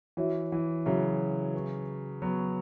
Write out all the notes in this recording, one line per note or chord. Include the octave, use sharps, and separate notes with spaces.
E3 F#4 C#5 E5
E3
C#3 F#3 F#4 C#5 E5
B4 G#5 C#6
F#3 B3 B4 G#5 C#6